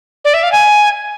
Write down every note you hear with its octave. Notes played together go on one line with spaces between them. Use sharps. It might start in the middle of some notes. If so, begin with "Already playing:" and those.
D5
E5
F5
G#5